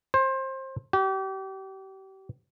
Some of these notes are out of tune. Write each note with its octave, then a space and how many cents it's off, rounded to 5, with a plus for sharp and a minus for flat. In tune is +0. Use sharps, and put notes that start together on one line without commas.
C5 +25
G4 -35